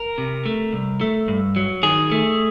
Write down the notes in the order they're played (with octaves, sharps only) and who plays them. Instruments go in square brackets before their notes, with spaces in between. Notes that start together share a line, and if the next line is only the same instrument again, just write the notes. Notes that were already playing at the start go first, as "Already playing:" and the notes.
Already playing: [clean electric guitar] A#4
C3
A3
C2
A3
G2
F#3
D#3 G#4
A3